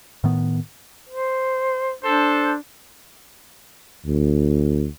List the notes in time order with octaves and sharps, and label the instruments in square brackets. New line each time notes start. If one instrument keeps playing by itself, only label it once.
[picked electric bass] A2 D#3 B3
[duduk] C5
[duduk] D4 [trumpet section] A4 C5
[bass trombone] D2